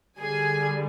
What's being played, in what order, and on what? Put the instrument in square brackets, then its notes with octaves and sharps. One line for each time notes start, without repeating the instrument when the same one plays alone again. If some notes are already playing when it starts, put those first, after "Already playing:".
[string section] D3 G3 G#4 G#5